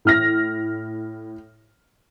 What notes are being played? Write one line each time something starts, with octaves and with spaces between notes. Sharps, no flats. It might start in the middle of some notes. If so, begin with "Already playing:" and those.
A2 F6 A#6